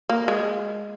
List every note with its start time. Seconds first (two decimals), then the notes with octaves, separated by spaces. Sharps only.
0.09 A#3
0.28 G#3